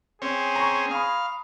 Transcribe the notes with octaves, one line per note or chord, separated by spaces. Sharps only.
C4 C#4 G#4
A#5 C#6
F5 B5 D#6